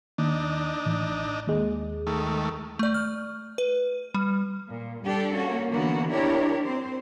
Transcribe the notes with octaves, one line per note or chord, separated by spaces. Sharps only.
D#2 D4 D#4
A1
D#2 G#3
D#3 A3
A3 D5
F6
B4
G3
A#2
G3 D4 G4 A4
A#3 C#4 F#4
D3 E3 A#3 B3 F#4
D4 E4 G4 A#4 C#5
C4 C5